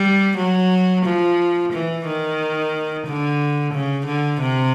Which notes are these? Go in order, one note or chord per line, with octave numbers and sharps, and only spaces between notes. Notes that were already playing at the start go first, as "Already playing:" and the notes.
Already playing: G3
F#3
F3
E3
D#3
D3
C#3
D3
C3